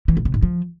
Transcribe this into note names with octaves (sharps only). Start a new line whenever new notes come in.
E3
B2
C3
G#2
F3